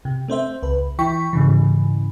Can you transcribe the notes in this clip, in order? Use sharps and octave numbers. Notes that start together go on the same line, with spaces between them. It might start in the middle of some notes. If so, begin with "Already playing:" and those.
C3
A3 C4 C5 E5
C#2 B4
E3 E4 G5 C#6 B6
G#2 C#3 E3